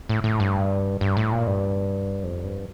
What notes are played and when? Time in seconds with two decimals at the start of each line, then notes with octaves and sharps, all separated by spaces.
0.09 A2
0.24 A2
0.40 G2
1.01 G2
1.17 A2
1.32 A#2
1.47 G2
2.24 F2
2.44 G2